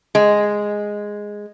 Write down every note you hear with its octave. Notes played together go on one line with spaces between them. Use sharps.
G#3